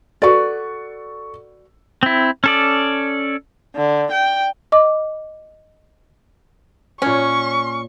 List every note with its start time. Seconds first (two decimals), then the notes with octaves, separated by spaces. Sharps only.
0.22 F#4 A4 B4 D5 C#6
2.03 C4 E4
2.44 C#4 A4 D5
3.76 D3
4.12 G5
4.72 D#5 D6
7.02 A#2 C#4 C#5 C#6